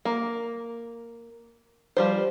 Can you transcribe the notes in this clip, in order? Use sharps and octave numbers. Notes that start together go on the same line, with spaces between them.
A#3
F3 G3 C5